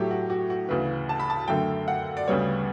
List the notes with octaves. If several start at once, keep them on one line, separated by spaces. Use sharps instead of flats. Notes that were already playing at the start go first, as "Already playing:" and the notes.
Already playing: A2 F#3 A3 G4
F#4
F#4
F#4
D2 C#3 E3 B4
A5
B5
A5
F#2 D3 A3 G5
F#5
D5
D2 C#3 G3 B3 C#5